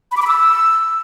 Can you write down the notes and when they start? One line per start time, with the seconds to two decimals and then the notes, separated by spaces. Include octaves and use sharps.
0.12 B5
0.17 D6
0.22 B5
0.27 E6